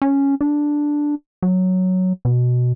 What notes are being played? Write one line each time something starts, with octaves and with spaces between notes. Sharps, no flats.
C#4
D4
F#3
B2